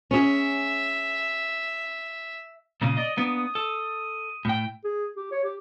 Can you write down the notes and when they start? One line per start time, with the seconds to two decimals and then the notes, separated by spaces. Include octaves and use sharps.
0.11 C#4 G#4 E5
2.81 A#2 C#3 A#3 D#6
2.97 D5 D#5
3.17 A#3 B3 D4
3.55 A4
4.45 A2 G5
4.84 G#4
5.17 G4
5.31 C#5
5.44 G4